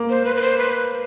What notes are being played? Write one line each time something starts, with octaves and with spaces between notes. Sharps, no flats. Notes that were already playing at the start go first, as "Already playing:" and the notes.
Already playing: A#3
C5
B4
B4
C5
B4